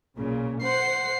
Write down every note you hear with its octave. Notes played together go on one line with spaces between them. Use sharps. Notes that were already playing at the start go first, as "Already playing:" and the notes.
B1 A#2 C#3
C5 F#5 C7